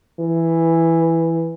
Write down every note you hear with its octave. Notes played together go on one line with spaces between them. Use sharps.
E3